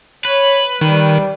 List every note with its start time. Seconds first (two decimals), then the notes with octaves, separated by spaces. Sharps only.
0.25 B4 C#5
0.81 D#3 G3